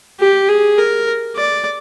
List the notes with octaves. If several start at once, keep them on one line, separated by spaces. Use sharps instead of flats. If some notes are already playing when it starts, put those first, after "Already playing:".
G4
G#4
A#4
D5